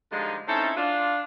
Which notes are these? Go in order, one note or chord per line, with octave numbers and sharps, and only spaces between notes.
D3 F3 G3 G#3 D#4 F4
C4 C#4 D#4 E4 A4
D4 F4